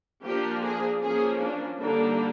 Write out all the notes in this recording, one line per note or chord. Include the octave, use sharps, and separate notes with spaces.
F3 A#3 D4 G4
G#4
F3 A#3 C#4 G#4
D4
D3 G3 A#3 D4 D#4